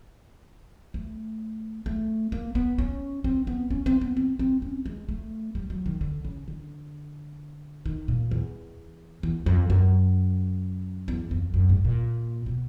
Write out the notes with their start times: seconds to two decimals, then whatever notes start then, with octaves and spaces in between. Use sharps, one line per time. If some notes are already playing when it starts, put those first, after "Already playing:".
0.94 A3
1.86 A3
2.32 A#3
2.55 B3
2.78 C#4
3.24 C4
3.47 B3
3.71 C#4
3.86 C4
4.01 B3
4.17 C4
4.39 C4
4.62 C#4
4.86 G#3
5.09 A3
5.55 G3
5.70 F#3
5.86 D#3
6.01 D3
6.25 C#3
6.48 D3
7.86 D#3
8.08 A#2
8.31 E2
9.23 E2
9.46 F2
9.70 F#2
11.08 E2
11.31 F2
11.54 F#2
11.69 G#2
11.85 A#2
12.46 B2